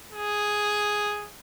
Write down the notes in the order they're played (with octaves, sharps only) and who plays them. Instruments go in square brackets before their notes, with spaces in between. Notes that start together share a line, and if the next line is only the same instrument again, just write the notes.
[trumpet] G#4